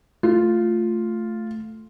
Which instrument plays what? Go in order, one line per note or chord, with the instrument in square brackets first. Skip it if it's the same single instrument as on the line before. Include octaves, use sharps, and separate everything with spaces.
[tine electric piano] A3 [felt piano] F4